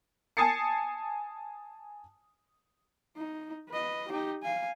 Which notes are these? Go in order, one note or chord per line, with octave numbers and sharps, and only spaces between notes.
G#5 A5 D#6 A6 C7 C#7
D#4
B4 D#5
D#4 G4
F5 G#5